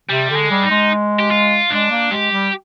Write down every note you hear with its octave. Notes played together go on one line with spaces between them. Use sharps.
C3 G3
D3
G#3
G3
D#4
G#3
G4
F4
G#3 D4
A#3
G#3 G4
G3